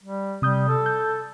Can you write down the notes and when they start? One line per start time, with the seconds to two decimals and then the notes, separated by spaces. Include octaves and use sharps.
0.03 G3
0.42 C3 G3 D#6 G6
0.68 A4
0.86 G6